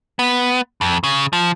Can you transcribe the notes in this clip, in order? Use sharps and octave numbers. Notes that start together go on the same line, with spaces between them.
B3
F2
C#3
F3